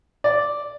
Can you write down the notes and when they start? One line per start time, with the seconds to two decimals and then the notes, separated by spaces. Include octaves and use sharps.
0.24 D5